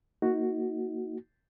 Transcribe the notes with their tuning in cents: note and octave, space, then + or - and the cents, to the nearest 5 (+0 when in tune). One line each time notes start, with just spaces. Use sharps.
A#3 -10 D#4 +35 F#4 +0